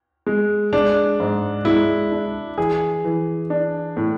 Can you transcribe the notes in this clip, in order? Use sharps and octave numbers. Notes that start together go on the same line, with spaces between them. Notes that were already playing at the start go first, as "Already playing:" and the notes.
G#3
G#3 D4
G#2
G#3 E4
D4
E3 G#4
E3
D4
A2